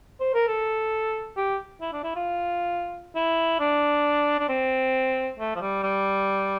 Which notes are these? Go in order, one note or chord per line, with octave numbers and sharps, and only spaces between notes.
C5
A#4
A4
G4
E4
D4
E4
F4
E4
D4
D4
C4
A3
F3
G3
G3